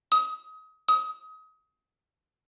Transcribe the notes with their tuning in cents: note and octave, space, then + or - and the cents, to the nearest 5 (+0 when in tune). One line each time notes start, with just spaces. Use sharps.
D#6 +30
D#6 +30